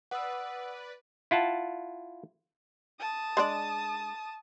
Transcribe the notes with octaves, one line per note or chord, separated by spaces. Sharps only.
B4 D5 F#5 D#6 E6
E4 F4 F#5 A5
A5 D#6
G#3 D4 D5